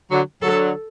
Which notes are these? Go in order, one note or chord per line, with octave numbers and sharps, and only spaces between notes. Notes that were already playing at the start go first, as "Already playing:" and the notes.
D3 F#3
D3 F#3 A4